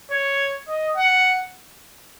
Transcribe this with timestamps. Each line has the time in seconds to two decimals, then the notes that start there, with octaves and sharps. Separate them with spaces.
0.11 C#5
0.68 D#5
0.97 F#5